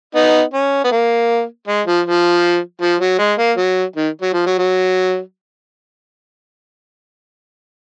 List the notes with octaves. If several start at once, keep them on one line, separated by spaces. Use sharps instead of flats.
B3 D#4
C#4
B3
A#3
G#3
F3
F3
F3
F#3
G#3
A#3
F#3
D#3
F#3
F3
F#3
F#3